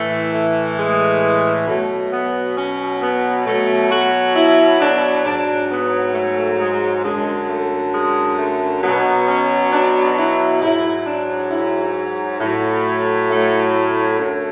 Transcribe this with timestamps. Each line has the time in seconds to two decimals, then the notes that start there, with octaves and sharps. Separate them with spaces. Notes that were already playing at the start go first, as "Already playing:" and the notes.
Already playing: A2 E3 A3
0.33 A3
0.78 G#3
1.68 B2 F#3 A3
2.12 B3
2.57 C#4
3.01 B3
3.46 B2 F#3 A3
3.90 F#4
4.35 E4
4.80 D4
5.25 G#2 F#3 D4
5.70 B3
6.14 A3
6.60 G#3
7.03 F#2 D3 F#3 G#3
7.49 A3
7.94 G#3
8.38 A3
8.83 B2 F#3 B3
9.28 C#4
9.72 D4
10.18 E4
10.62 G#2 F#3 E4
11.06 D4
11.51 E4
12.40 A2 F#3 A3
13.30 A3
13.75 A3
14.19 F#2 D3 F#3